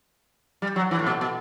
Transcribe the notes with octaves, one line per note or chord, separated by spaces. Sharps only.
G3
F#3
E3
A2
B2
B2